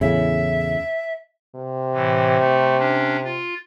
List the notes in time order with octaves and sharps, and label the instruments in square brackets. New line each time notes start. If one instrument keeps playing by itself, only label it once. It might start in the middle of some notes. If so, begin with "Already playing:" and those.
[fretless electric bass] E2 A2 C#3 [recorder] E5
[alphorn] C3
[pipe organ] A2 E3
A3
C#4 D4
F4